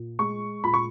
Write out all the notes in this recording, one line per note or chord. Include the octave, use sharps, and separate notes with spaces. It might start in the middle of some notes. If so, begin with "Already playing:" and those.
Already playing: A#2
G#3 C#6
A#2 B5
C#6